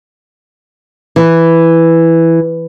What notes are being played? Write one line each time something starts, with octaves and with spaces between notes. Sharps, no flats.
E3